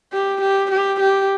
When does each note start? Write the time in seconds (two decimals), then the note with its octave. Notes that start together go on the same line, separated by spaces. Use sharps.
0.12 G4
0.41 G4
0.71 G4
1.00 G4